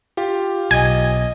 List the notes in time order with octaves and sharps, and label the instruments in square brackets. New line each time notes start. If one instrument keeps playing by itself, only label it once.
[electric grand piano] F4 G4
[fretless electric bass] B1 [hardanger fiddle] D#5 [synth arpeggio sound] G#5